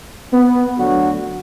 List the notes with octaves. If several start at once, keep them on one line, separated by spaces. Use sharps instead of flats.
B3
D2 D3 F#3 F#4